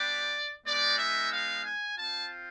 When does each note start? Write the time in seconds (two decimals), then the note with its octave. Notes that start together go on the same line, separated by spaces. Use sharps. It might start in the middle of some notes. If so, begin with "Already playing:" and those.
Already playing: G3 B3 D4 G4 D5
0.66 G#3 B3 D#4 D5
0.98 E5
1.32 F5
1.64 G#5
1.97 C4 F4 A5